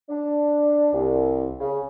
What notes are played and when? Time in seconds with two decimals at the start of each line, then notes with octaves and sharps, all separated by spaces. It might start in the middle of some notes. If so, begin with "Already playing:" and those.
0.09 D4
0.93 C2
1.60 C#3